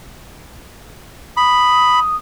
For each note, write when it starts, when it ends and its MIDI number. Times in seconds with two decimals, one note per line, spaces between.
1.37 1.99 83
1.37 2.16 87